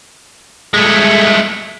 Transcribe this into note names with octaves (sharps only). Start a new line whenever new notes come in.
G#3 A3